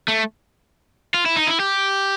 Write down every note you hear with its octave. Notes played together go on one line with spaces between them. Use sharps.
A3
F4
E4
D#4
E4
G4